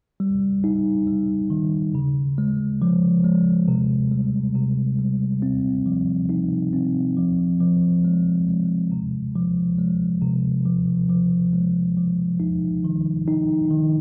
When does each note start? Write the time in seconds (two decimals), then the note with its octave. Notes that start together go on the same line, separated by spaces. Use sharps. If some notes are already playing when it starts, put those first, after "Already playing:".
0.20 G3
0.64 D#4
1.07 G3
1.50 D#3
1.95 C#3
2.38 G#3
2.82 F3
3.25 G#3
3.68 C3
4.11 G3
4.56 C3
4.99 G3
5.42 C4
5.86 F3
6.29 D#4
6.73 C4
7.17 F3
7.60 F3
8.04 G#3
8.48 G#3
8.92 C3
9.36 F3
9.78 G#3
10.22 C3
10.66 F3
11.09 F3
11.53 G#3
11.97 F3
12.40 D#4
12.84 D#3
13.28 D#4
13.71 D#3